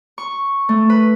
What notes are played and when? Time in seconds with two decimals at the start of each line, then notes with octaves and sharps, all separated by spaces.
0.18 C#6
0.69 A3
0.90 B4